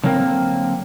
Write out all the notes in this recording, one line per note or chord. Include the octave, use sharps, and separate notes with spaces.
D3 F#3 A#3 C4 A#4